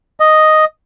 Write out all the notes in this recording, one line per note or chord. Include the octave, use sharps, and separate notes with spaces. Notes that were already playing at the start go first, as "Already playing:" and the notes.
D#5